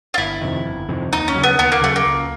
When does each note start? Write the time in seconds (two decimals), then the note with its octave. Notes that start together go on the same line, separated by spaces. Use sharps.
0.14 F4
0.18 G1 E4
0.41 F2 C3 D#3
0.66 G1
0.89 F2 C3 D#3
1.12 D#2 D#4
1.28 C#4
1.35 C#3 F#3
1.44 B3
1.59 D#2 B3
1.72 A#3
1.82 C#3 F#3 A3
1.96 A#3
2.06 C#2